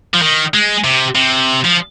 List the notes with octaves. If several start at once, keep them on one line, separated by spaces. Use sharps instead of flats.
F3
D#3
G#3
C3
C3
F3